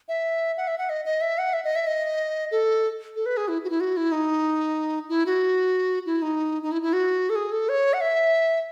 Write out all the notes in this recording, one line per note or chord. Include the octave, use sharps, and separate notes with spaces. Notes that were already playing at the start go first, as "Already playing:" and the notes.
E5
F#5
E5
F#5
D#5
D#5
E5
F#5
E5
D#5
E5
D#5
A4
A4
B4
G#4
E4
F#4
E4
F#4
E4
D#4
E4
F#4
E4
D#4
D#4
E4
E4
F#4
A4
G#4
A4
C#5
F#5
E5